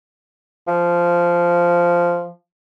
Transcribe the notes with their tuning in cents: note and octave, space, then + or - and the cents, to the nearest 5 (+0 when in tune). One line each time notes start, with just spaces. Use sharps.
F3 -10